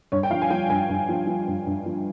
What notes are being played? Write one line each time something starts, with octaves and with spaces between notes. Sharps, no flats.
G2 C#5
G5
F3 F5
G#5
F3 G5
G2 G#5
G2
F3
F3
G2
G2
F3